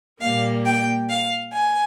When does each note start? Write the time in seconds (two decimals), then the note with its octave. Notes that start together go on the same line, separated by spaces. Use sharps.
0.22 A#2 G3 A#3 F5
0.65 G5
1.09 F5
1.53 G#5